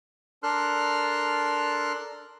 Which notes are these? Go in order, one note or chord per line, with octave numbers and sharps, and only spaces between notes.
D4 A4 A#4 C6 F6 F#6